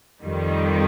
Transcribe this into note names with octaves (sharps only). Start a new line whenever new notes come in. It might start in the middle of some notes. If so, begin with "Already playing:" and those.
F2 D#3 G3